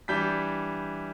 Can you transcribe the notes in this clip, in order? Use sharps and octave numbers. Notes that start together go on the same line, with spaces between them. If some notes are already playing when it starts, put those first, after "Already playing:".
E3 G3 D4 G6 B6